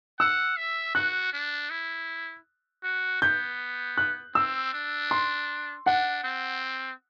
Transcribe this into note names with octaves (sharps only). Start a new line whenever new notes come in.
F#5 E6
E5
F#4 F#6
D4
E4
F#4
B3 G6
F#6
C4 E6
D4
C6
D4 F#5
C4